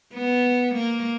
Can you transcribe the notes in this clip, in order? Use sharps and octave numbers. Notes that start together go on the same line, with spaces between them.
B3
A#3